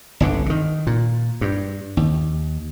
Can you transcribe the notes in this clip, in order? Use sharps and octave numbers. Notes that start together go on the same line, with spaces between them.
G1 C2 D3
D3 D#3
A#2
G2
D#2